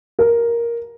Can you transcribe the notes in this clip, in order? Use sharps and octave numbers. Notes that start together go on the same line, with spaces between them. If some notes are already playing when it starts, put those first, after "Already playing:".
A#4